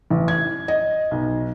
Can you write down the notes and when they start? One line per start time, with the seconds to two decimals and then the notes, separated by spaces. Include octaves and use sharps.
0.11 A1
0.28 G#6
0.68 D#5
1.11 B1